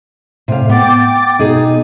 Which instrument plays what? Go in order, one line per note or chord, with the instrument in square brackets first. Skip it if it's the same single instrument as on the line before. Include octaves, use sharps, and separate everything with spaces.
[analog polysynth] A2 [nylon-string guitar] C3 F5
[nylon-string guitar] B3 [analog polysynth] G5 D6 A6
[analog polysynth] B2 [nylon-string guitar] D#4 G#4